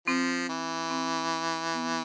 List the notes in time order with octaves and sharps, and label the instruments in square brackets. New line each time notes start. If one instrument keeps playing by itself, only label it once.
[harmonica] F3 [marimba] C4
[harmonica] E3
[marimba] C4
B3